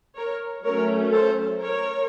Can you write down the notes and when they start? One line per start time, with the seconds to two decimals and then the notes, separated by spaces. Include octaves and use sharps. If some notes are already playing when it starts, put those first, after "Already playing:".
0.16 A#4 C#5
0.64 F#3 A3 C#4 A#4 C#5
1.12 A4 C5
1.60 A#4 C#5